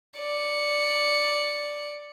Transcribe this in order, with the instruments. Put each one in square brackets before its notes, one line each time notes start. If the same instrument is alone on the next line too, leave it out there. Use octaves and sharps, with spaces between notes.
[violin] D5 C#7